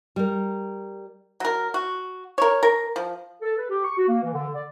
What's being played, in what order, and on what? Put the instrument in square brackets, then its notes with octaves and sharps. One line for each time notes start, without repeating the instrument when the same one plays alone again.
[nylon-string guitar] G3 A#4
[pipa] F#3 A#4
F#4
A#4 C#5
A#4
F3
[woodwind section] A4
B4
G4
C#6
F#4
A#3
E3
D3
D5